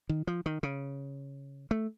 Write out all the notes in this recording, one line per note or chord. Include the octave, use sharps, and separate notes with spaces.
D#3
F3
D#3
C#3
A3